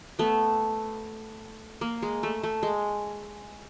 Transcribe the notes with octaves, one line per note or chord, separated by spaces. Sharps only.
A3 B3
A#3
G#3
A3
A3
G#3